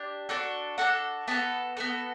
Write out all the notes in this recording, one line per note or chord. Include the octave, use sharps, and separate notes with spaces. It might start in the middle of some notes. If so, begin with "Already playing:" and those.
Already playing: D4 G4
D4 F#4 A4
D4 F#4 A4 F#5
B3 F#4 A4 A5
B3 F#4 A4